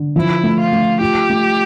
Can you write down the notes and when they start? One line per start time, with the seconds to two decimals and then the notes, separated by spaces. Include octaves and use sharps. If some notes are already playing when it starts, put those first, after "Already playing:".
Already playing: D3
0.16 F3 E4
0.43 A3
0.58 F4
0.72 A3
1.01 F4 G4
1.30 A3